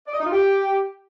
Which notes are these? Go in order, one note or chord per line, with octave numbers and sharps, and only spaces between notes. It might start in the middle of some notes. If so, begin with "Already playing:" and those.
D5
D#5
D#4
F4
G4